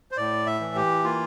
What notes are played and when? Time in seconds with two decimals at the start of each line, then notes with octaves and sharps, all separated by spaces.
0.11 C5
0.17 A2 D5
0.46 E5
0.60 E3
0.75 G4
1.04 A#3 F4